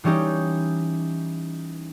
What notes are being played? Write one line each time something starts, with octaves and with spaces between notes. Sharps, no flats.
E3 G3 C#4 D#4 G4